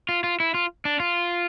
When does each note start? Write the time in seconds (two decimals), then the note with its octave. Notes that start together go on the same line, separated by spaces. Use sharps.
0.09 F4
0.24 F4
0.40 E4
0.54 F4
0.85 D4
1.00 F4